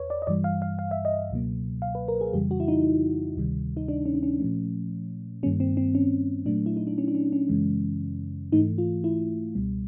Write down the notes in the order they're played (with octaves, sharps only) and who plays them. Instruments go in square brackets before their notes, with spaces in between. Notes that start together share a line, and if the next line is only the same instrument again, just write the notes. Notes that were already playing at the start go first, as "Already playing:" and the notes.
Already playing: [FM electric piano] E2 B4 C#5
D5
D#5
G2 E3 G3 D5
F5
F5
F5
E5
D#5
C#2 B2 F#3 A#3
F5
B4
A#4
G#4
F2 C#3 E3 G3 G4
F#4
E4
D#4
D2 C3 D#3 G3
D#4
D4
C#4
D4
C#4
A#2 F3 A3
G2 D#3 G3 A#3 C#4
C4
C4
C#4
A#2 F#3 A3 D4
E4
D#4
D4
C#4
D4
C#4
C#4
F#2 C#3 E3 G#3
G#2 E3 A3 D#4
F4
E4
C#2 B2 G3